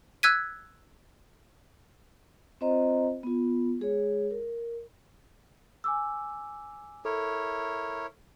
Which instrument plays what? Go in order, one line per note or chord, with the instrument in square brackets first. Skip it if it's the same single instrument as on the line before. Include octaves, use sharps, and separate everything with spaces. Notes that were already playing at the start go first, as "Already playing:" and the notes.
[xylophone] E6 F#6 G#6 B6 D#7
[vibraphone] C4 F4 C5 D#5 A#5
B3 F4
G#3 G#4 C#5
A#4
[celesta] G#5 D6 E6
[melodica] E4 A#4 C#5 [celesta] A4